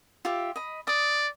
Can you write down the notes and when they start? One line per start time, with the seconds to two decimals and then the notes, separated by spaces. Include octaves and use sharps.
0.25 F4 G4 E5
0.56 D#5 B5
0.87 D5 D#6